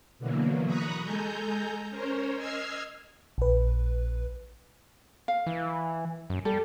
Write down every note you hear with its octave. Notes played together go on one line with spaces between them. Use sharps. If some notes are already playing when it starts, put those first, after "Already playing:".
B2 D3 E3 F#3 A#3
A#5 B5 C#6 D#6 F#6
G#3 A4 G#5 A#5 G6
C#4 A#4 C5 C#5
D#5 E6 F6 G#6 C7
A#1 B4
F5
E3
F#2
G3 A4